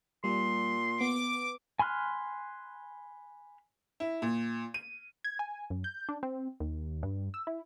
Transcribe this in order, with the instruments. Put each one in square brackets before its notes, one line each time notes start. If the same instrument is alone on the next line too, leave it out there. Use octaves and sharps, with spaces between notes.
[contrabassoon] A#2 [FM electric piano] G3 [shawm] C6
[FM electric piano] B3 [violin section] D6
[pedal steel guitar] G#5 B5 C6 F6 F#6
[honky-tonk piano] E4
A#2
D#7
[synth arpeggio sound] G#6
G#5
F#2
G6
D4
C4
D#2
G2
E6
E4